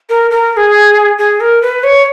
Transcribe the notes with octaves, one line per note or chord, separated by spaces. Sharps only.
A#4
A#4
A#4
G#4
G#4
A#4
B4
C#5